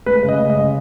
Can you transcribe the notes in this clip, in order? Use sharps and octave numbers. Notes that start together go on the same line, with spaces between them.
G#3 B4
C#3
D#5
G#3
D#5
C#3